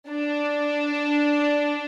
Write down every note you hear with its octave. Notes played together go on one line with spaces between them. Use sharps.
D4